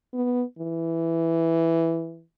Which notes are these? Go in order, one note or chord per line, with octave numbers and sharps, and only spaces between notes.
B3
E3